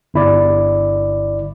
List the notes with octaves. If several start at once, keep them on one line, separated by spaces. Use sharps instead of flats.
G1 E4 D5